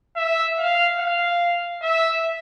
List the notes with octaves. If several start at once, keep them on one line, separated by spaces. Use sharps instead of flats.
E5
F5
F5
E5